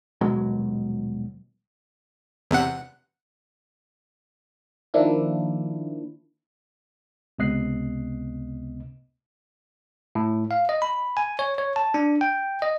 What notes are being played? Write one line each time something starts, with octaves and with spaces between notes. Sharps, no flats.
D#1 B2 F#3 G#3
E2 C3 F#5
D#3 F3 A#3 D4 E4
C#2 C3 B3 D#5 F#6 C7
A2
F5
D#5
B5
G#5
C#5
C#5
A5
D4
G5
D#5